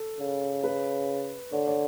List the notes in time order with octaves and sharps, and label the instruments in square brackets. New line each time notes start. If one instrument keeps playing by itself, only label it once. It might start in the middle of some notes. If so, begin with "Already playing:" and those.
Already playing: [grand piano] A4
[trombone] C#3
[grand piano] B4
[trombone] D3 [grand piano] C#5
[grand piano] C#5